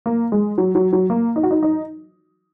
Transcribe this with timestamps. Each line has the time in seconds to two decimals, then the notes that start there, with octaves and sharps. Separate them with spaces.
0.06 A#3
0.32 G#3
0.58 F#3
0.75 F#3
0.93 F#3
1.10 A#3
1.36 D#4
1.43 F#4
1.51 D#4
1.63 D#4